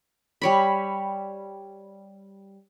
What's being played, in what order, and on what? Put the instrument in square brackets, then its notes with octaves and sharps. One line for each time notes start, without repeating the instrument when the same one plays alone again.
[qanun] G3 C#5 B5